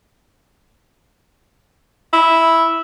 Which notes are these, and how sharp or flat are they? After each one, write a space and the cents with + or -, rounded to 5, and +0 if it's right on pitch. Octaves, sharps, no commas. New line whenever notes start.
E4 -5